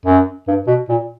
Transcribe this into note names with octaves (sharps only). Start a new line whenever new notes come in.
F#2
G2
B2
A#2